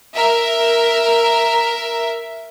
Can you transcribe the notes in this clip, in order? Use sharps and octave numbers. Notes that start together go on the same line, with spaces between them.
A#4 E5